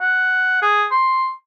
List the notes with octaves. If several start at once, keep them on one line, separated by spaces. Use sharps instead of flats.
F#5
G#4
C6